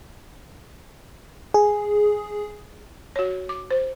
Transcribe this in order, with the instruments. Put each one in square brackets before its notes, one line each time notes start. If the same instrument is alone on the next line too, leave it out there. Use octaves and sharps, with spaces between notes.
[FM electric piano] G#4
[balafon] F#4 C#5
D6
C5